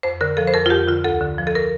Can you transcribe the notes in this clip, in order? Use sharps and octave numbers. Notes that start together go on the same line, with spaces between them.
F2 C5
D3 A#4
F3 A4
C5
F2 A#4
F4
F2 G4
D3 F4
D2 A4
D3
F3
A4
A#4